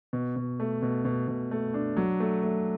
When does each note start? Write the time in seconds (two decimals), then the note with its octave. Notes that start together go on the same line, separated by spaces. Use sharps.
0.13 B2
0.36 B2
0.60 A3
0.82 B2
1.05 B2
1.28 B2
1.51 A3
1.74 D4
1.97 F#3
2.20 A3
2.43 A3